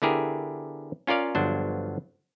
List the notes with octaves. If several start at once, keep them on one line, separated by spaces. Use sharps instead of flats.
D3 B3 E4 G4 G#4 A#4
C#4 F4 A#4 D5 F5
G1 F3 F#3 D4 C5